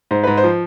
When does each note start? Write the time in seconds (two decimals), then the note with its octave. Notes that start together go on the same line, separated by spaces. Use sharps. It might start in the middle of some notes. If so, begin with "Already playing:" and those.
0.11 G#2 C5
0.24 G#2 B4
0.37 C5
0.44 F3